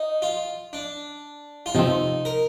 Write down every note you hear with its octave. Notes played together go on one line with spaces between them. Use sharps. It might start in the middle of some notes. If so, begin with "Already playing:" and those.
Already playing: D#4
F4
D4
F4
C3 F3 C4 D#4
A#4